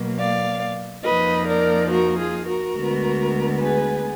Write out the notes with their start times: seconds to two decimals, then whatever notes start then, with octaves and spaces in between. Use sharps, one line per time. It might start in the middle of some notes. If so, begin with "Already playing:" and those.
Already playing: B2 F#3 A#3
0.18 D5 F5
1.03 F2 F3 A#3 D#4 B4 D#5
1.47 A#4 D5
1.89 F#4 A#4
2.17 F4 G#4
2.46 F#4 A#4
2.75 D2 D3 G#3 B3
3.61 G#4 B4